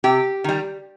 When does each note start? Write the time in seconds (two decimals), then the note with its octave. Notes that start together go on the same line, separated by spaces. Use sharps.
0.04 C3 G4
0.44 D#3 G3